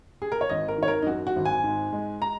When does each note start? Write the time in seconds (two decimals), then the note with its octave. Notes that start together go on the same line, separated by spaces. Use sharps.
0.22 G#4
0.32 A#4
0.41 C#5
0.49 G#1 D#5
0.68 A#4
0.78 D#3 C#5
0.88 A#4
1.02 D#4
1.07 F#2 F#4
1.27 F#4
1.36 G#1
1.45 G#5
1.64 G#2
1.93 G#3
2.22 A#5